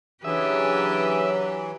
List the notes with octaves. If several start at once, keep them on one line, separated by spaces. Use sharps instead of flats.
C#3 E3 F#3 D4 G4 G#4 B4 E5